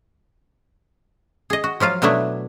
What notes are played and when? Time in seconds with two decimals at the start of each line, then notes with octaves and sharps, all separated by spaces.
1.50 G#4 D#5
1.64 F#4
1.80 F3 F#3 F4 F5
2.02 B2 F#3 A3 B3 D4 E4